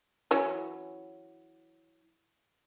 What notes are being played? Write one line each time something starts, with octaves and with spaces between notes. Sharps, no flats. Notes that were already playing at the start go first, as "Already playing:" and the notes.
E3 F#3 C#4